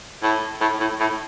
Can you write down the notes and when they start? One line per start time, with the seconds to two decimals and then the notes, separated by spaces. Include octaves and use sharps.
0.23 A2
0.61 A2
0.81 A2
1.00 A2